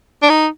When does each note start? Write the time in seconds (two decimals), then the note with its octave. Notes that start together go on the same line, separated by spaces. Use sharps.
0.23 D4
0.30 D#4